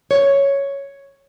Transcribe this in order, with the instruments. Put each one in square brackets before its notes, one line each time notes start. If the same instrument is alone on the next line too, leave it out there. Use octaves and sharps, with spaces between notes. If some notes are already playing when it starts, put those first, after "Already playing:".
[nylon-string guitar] C#5